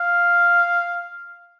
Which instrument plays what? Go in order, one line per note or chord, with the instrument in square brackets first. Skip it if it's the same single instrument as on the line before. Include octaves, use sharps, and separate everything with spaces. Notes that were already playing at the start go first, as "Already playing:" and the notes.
Already playing: [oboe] F5